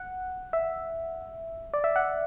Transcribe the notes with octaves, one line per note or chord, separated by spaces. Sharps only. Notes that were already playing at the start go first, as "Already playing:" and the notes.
Already playing: F#5
E5
D5
E5
F#5